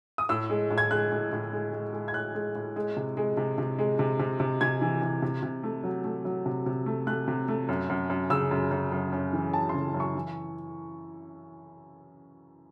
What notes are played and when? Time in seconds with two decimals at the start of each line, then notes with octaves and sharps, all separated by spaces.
0.18 D#6
0.29 A2 E6
0.50 G#3
0.70 A2
0.78 G#6
0.91 G#3 F#6
1.12 A2
1.32 A2
1.53 G#3
1.73 G#3
1.93 G#3
2.08 G#6
2.14 A2 F#6
2.35 G#3
2.55 A2
2.76 G#3
2.96 C3
3.17 G#3
3.37 C3
3.58 C3
3.79 G#3
3.99 C3
4.19 C3
4.40 C3
4.61 C3 G#6
4.81 E3
5.02 C3
5.22 C3
5.43 C3
5.63 A3
5.84 F#3
6.04 A3
6.25 F#3
6.46 C3
6.66 C3
6.86 A3
7.07 A3 F#6
7.28 C3
7.48 A3
7.69 F#2
7.89 F#2
8.10 F#2
8.30 C#3 E6
8.51 F#2
8.71 F#2
8.92 F#2
9.12 F#2
9.33 E3
9.53 F#2 A5
9.69 C6
9.74 C#3
9.94 F#2
10.00 C#6
10.15 E3